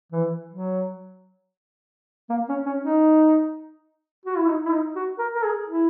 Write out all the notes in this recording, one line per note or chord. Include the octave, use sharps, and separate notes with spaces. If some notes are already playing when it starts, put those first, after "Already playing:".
E3
F#3
A#3
C#4
C#4
D#4
F#4
E4
D#4
E4
D#4
F#4
A#4
A#4
G#4
E4